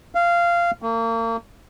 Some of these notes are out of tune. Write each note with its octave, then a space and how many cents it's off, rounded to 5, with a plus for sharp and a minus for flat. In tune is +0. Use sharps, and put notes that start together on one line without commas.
F5 -15
A#3 -35